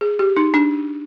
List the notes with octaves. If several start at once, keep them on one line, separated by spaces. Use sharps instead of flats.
G#4
G4
D#4
D4